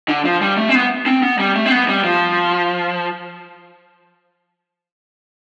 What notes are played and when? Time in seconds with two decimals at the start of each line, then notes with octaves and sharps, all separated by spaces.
0.09 D3
0.25 F3
0.41 G3
0.57 A3
0.69 C4
0.75 B3
1.06 C4
1.22 B3
1.39 G3
1.56 A3
1.66 C4
1.71 B3
1.89 G3
2.04 F3